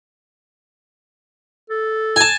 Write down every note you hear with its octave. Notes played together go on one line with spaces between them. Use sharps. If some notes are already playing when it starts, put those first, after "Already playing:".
A4
G#5 A5